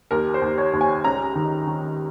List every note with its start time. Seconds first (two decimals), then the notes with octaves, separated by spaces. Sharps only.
0.11 D#2 A#4
0.34 C5
0.42 D#2
0.58 C#5
0.73 D#2
0.81 G#5
1.04 C#2 A#5
1.35 D#3
1.67 D#3